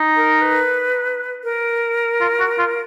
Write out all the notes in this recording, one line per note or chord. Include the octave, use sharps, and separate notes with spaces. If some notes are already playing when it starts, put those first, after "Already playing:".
Already playing: D#4
A#4
B4
A#4
F4
F#4
F4